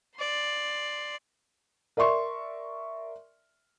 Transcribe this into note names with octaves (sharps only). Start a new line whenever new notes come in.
D5 C6
A#4 D5 E5 C6 C#6